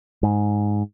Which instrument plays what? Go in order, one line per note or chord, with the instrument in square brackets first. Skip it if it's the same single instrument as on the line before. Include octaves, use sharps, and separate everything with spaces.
[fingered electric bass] G#2